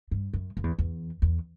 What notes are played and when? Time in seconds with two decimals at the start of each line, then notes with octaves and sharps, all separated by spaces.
0.11 G2
0.33 F#2
0.57 F#2
0.64 E2
0.79 E2
1.22 E2